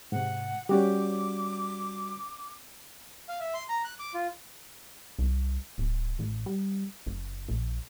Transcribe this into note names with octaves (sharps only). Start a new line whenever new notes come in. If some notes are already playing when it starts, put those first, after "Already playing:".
G#2 C3 F#5
G3 C#4 F#4 G4 D5 D6
F5
E5
C6
A#5
F#6
D6
F4
C2
D1
A1
G3
F#1
A#1